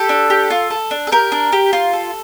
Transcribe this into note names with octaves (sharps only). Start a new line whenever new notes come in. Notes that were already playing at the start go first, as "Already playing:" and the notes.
Already playing: G4 A4
D4
G4
F4
A4
D4
A4
G4 A#4
D4
G4
F4
A4